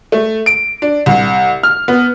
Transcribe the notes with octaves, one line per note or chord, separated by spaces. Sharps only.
A3
D7
D4
C2
F6
B3